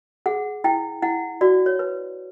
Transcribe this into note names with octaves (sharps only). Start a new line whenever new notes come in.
G#4 F#5
E4 G5
E4 F#5
F#4 D5
C#5
B4